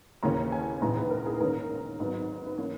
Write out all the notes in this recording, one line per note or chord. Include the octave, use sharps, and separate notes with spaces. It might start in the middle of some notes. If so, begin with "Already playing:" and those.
D#2 C#3 E3 A#3 C#4 A#5
G#5
A#1 G#2 E3 B3 A#5
B4
A#4
G#4
G#2 D#3 A#3 C#4 A#4
G#1 G#2 F#3 B3
B4
E3 A#3 C#4 C#5